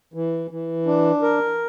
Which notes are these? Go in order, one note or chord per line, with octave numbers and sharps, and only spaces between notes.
E3
E3
D4
A#4